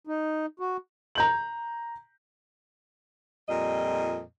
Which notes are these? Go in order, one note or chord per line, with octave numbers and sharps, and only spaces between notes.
D#4
F#4
A#5 G6 F#7
F2 A#2 G3 D#5